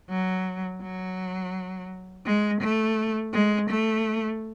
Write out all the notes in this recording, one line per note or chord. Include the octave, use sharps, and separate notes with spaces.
F#3
F#3
G#3
A3
G#3
A3